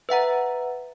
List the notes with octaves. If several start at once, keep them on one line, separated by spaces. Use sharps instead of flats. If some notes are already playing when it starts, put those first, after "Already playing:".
B4 E5 F#5 A#5